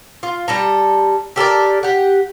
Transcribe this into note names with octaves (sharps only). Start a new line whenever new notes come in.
F4
G3 A4 A#5
G4 A4 A#4 D5
G4 F#5